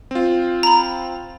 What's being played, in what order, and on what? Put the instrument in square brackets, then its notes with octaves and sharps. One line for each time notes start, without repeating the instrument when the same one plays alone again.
[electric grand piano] C4 F4
[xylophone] A#5 B5